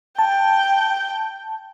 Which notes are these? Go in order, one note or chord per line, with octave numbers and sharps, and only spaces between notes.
G5 A5